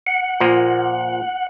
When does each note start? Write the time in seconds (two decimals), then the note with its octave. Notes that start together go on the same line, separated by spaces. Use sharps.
0.07 F#5
0.40 A#2 F3 A#3